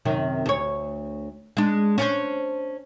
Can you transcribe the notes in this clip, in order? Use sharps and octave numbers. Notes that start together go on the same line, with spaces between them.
F#2 C3 D#3
D2 C#5
G#3 D4
C#4 D4 C5